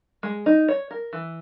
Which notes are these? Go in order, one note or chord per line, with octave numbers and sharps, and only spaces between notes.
G#3
D#4
C#5
A#4
E3